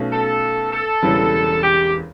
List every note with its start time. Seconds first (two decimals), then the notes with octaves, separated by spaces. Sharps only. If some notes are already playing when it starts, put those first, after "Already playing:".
Already playing: B1 B2 A3 C#4
0.12 A4
0.72 A4
1.02 E1 E2 C#3 E3 G3
1.63 G4